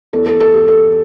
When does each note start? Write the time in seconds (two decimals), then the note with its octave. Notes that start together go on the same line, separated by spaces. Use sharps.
0.13 E2 E3 A4
0.26 A4
0.40 A4
0.54 G4
0.68 A4